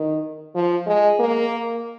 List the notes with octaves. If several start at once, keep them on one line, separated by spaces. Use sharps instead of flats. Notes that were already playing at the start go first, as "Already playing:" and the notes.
Already playing: D#3
F3
G#3
A#3